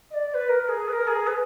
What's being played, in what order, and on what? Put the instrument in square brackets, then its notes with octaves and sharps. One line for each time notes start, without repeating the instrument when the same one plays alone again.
[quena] D#5
D5
D5
B4
A#4
G#4
B4
A#4
G#4
B4